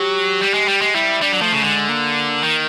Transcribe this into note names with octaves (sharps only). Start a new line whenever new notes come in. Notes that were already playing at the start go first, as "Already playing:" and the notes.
Already playing: F#3 G4
G3
G#3
G3
G#3
G3 E4
E4
G3 D4
F#3
F3 A3
C#3
D3 G#3
G#3
A#3
D#3